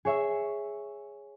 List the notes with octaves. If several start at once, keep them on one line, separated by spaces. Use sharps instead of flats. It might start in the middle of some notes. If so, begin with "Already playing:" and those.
G#4 C#5 E5